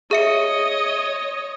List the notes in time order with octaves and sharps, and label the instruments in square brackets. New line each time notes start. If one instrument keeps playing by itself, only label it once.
[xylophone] G#4 E5 C#7 [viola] C#5 D#5